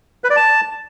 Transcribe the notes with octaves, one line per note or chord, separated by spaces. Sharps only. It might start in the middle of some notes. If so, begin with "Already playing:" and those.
B4
D5
A5